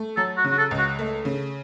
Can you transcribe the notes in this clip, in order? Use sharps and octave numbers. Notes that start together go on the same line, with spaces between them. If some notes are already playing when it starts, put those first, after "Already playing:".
Already playing: A3
F#3 A4
F#4
C#3
F#4
A4
C#2
F#4
A3
C#3